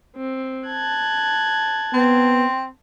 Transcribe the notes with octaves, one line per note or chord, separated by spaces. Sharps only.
C4
A5 F#6 G#6
B3 C4